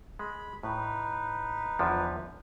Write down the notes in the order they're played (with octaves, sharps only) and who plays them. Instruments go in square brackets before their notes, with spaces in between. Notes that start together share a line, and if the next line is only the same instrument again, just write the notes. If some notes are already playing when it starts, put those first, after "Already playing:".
[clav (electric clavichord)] G#3 [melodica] B5
[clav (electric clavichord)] A2 [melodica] D#4 B4
[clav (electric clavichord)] E2 D3 F3